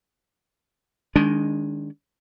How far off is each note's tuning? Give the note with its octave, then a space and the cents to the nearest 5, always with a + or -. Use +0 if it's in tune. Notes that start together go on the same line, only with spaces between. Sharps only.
D#3 -10 G#3 -5 D4 -35